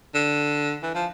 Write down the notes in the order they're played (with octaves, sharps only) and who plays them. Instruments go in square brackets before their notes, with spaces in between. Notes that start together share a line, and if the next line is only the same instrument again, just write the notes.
[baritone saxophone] D3
E3
F3